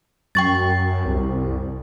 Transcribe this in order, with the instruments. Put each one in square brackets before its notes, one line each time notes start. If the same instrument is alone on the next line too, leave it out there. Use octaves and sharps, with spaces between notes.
[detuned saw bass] F#2 [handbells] G5 C#6 A6
[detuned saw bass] C2